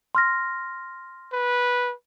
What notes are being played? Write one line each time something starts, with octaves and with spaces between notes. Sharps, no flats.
C6 F6 A#6
B4